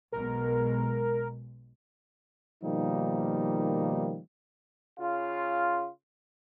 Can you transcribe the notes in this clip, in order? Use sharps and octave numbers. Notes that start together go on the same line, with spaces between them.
B1 B2 G#3 A#4
B2 D#3 F3 G3 A#3 D#4
C#3 F4